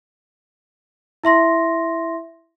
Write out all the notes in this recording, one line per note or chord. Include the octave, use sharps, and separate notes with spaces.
E4 E5 C6 A#6